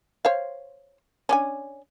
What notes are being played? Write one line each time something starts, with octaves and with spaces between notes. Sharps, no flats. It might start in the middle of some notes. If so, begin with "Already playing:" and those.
C5 C#5 F5
C#4 D4 G#5